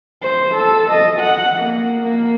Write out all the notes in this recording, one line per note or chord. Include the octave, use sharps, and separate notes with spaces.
C5
A4
D#5
F#5
A#3
A#3